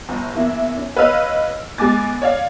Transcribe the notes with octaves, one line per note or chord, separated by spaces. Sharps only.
G1
E2 A#3 E4
C#4
B4 C#5 D#5 F5 E6 F6
G#3 B3 G#5 D6 A6
C#5 D5 F5